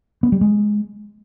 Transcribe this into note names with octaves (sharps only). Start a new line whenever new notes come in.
B3
G3
G#3